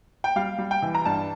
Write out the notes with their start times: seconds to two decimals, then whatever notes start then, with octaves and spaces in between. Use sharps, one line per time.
0.24 G5
0.36 G3 F5
0.59 G3
0.71 G5
0.82 E3
0.95 A#5
1.05 G2 A5